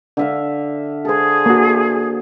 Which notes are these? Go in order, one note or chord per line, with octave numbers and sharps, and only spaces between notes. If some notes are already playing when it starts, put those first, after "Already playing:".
D3 E5 F5
G#4 A4 C5
A#3 F#4